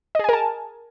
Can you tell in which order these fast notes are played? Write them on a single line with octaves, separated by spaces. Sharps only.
D#5 G#4 G#5 A#4 A5